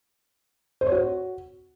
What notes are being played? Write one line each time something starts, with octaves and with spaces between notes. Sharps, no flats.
C5
C#5
F#4